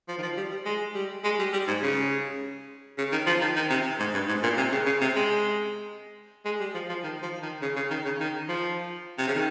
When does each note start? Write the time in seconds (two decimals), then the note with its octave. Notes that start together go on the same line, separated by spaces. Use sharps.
0.08 F3
0.18 D#3
0.22 F3
0.37 G3
0.51 G3
0.65 G#3
0.95 G3
1.24 G#3
1.39 G3
1.53 G3
1.68 G#2
1.83 C#3
2.98 C#3
3.12 D#3
3.27 F3
3.41 D#3
3.56 D#3
3.70 C3
4.00 G#2
4.13 G2
4.28 G#2
4.43 A#2
4.57 C3
4.72 C#3
4.86 C#3
5.01 C3
5.16 G#3
6.45 G#3
6.60 G3
6.75 F3
6.89 F3
7.03 D#3
7.23 F3
7.42 D#3
7.62 C#3
7.76 C#3
7.90 D#3
8.05 C#3
8.20 D#3
8.49 F3
9.18 C3
9.27 C#3
9.35 D#3